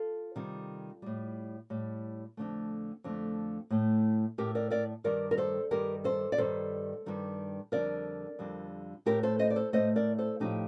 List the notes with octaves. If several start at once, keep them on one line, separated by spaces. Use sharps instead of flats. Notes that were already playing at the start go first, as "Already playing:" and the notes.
Already playing: F4 A4
C3 D#3 G3
A2 G3
A2 G3
F2 D3 A3
F2 D3 A3
A2 A3
A2 A3 G4 A#4
A#4 D5
A#4 D5
G2 D#3 G3 A#4 D5
A#4
A4 C5
G2 D#3 G3 G4 A#4
A4 C5
D5
G2 D#3 G3 A4 C5
G2 D#3 G3
F2 D3 G3 A#4 D5
F2 D3 G3
A2 A3 G4 A#4
A4 C5
C5 D#5
D5
A4 C5
A2 A3 C5 D#5
A#4 D5
A4 C5
A2 F3 A3 D#4 G4